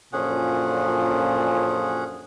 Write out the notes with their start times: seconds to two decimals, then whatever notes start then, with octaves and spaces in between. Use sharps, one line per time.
0.13 F#2 A#2 D3 F3 C#4 G#4 F#5